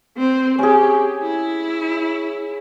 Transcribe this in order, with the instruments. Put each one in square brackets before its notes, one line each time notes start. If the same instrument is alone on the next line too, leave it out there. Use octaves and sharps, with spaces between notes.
[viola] C4 C5
[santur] C#4 G#4 [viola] G4
[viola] E4